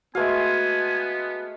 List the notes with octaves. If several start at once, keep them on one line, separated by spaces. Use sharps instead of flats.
G#3 A3 B3 F#4 B4 F5 G#5